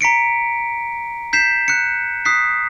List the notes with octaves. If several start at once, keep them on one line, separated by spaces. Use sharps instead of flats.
A#5 B6 C#7 D7
G6 B6 C7 E7
F#6 C#7
D#6 F#6 B6 C7